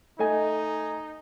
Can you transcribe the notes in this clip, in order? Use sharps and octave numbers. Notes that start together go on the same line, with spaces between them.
A3 D#4 D#5 G#5